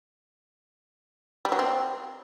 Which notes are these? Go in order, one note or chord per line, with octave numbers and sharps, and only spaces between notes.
G3
F#3
C4